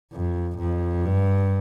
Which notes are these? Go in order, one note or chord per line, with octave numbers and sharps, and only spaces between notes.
F2
F2
G2